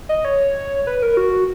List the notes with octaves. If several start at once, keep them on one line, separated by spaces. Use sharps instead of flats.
D#5
C#5
B4
A#4
F#4